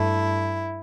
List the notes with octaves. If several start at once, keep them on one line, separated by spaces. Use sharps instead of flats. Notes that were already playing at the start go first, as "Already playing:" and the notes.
Already playing: G2 A3 E4